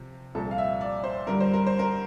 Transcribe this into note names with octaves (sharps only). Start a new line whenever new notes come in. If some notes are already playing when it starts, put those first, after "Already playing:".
Already playing: C3 F3 C4
C2 A#2 F3 A4
F5
E5
D5
C5
G2 D3 G3 A#4
C5
A#4
C5
A#4